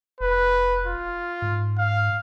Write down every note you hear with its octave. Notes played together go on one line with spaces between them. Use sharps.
F1 B4
F4
G#2
F5